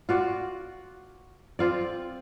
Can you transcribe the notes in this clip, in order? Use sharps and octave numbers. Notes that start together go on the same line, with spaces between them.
F4 F#4 D5
C4 F4 D5